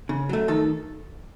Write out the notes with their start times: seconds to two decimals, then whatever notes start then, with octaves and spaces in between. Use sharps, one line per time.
0.09 C#3
0.29 F#3 A3
0.48 D#3 A4